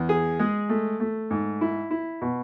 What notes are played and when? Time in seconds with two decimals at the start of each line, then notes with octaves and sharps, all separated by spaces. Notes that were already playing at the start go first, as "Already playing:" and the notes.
Already playing: E2
0.09 G#4
0.39 G#3
0.69 A3
1.00 A3
1.31 G#2
1.61 E4
1.91 E4
2.22 B2